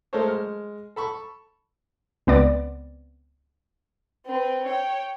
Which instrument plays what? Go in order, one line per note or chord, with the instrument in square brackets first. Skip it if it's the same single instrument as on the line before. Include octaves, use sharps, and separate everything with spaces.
[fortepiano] G#3 A3 A4 A#4 C5 C#5
G#3 F6
A4 B5 C#6
[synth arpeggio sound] C#2 B3 C4 D5
[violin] C4 B4
C#5 G5